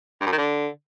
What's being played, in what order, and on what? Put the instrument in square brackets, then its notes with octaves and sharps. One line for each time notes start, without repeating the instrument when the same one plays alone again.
[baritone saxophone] G2
F#2
D#3
D3